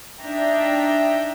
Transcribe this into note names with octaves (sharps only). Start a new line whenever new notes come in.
D4 D#4 E5 G5 A#5